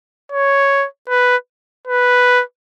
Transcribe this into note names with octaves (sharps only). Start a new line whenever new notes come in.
C#5
B4
B4